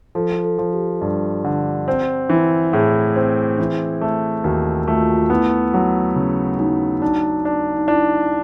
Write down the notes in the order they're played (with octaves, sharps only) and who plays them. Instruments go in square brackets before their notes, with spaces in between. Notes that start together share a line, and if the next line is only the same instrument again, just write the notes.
[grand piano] F3 [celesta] A4
[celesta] A4
[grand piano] F3
[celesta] G4
[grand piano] G2
D3
C4
E3
[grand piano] A2 [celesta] G#4
[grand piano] C4
E3
A3
[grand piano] D#2 [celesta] F#4
[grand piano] A3 [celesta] F4
[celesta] F#4
F4
F#4
F4
[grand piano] B3 [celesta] E4
[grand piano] F#3
C#3
[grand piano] F#3 [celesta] D#4
[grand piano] D4 [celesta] D#4
[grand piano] D4
[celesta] D#4
[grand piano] D4 [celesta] E4